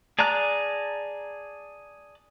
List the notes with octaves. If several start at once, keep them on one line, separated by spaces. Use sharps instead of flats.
G#4 D5 A5 A#5 F#6